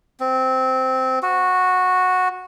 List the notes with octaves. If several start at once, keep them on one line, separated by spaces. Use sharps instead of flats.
C4
F#4